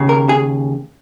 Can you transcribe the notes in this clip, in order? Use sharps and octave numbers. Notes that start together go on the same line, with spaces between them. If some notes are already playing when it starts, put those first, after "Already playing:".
Already playing: D#2 C#3
A#4
G#4